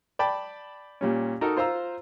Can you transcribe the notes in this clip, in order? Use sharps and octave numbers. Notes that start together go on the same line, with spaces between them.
D5 G5 A5 B5
A#2 G3 C#4
D#4 F#4 A4 A#4 D#5
F4 C5 F5 A#5 E6